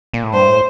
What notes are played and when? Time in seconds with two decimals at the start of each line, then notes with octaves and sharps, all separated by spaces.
0.13 A#2
0.24 A2
0.33 G2 C5
0.48 A2